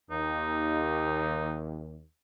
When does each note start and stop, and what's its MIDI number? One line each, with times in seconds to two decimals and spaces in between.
0.11 2.03 39
0.11 1.60 63